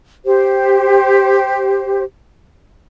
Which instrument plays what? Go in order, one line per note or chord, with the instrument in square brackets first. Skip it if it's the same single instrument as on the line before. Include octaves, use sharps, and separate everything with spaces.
[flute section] G4 C5